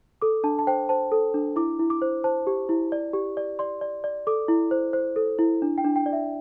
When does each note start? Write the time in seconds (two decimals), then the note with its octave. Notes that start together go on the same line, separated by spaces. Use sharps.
0.22 A4 D6
0.44 D4 A5
0.59 A5
0.67 C5 G5
0.89 C5 A5
1.12 A4
1.34 D4
1.56 E4 D6
1.79 E4
1.90 D6
2.02 C5
2.24 C5 A5
2.47 G4
2.69 E4
2.92 D5
3.13 G4
3.37 D5
3.59 D5 C6
3.81 D5
4.04 D5
4.27 A4 D6
4.48 E4
4.71 C5
4.93 C5
5.16 A4
5.39 E4
5.62 D4
5.78 G5
5.84 D4
5.96 G5
6.06 D5
6.13 E5